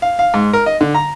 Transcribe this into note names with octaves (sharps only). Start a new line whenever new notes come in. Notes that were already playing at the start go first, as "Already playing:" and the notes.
F5
F5
G#2
A#4
D#5
D3
A#5